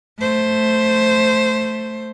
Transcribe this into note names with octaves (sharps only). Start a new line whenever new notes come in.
A3 C5